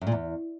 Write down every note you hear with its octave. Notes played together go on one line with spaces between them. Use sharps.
F#2
A#2
E2